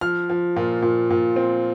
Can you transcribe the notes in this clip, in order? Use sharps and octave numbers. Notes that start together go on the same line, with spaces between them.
F3 F6
F3
A#2
A#2
A#2
C4